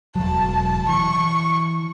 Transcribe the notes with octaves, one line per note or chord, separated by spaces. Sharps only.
E1 F#3 A5
E3 C#6